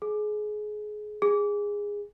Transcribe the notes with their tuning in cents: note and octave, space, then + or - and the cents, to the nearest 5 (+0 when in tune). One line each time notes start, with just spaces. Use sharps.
G#4 +25
G#4 -15